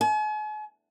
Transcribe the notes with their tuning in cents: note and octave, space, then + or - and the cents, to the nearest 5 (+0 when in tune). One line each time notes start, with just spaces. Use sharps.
G#5 +45